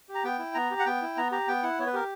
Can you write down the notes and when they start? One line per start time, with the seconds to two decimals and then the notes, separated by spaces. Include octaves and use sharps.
0.09 G4
0.15 A#5
0.24 B3 G5
0.39 E4
0.54 B3 A#5
0.71 G4
0.79 F#5
0.86 B3 G5
1.02 E4
1.17 B3 A#5
1.32 G4 A#5
1.48 B3 G5
1.63 E4 F#5
1.79 B3 C#5
1.87 B4
1.93 G4 A#4